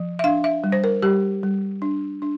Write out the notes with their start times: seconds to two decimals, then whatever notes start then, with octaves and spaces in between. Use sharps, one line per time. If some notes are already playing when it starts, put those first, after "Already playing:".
Already playing: F3
0.19 E5
0.24 D4 F5
0.44 E5
0.64 G3
0.72 C5
0.84 A#4
1.02 G3 G4
1.43 G3
1.82 D4
2.22 D4